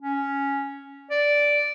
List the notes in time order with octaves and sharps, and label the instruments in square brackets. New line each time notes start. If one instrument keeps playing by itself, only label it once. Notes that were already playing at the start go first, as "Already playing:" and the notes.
[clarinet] C#4
D5